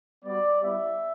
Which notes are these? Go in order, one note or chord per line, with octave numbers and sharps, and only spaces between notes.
G3 B3 F#4 D5
G3 B3 E4 G4 E5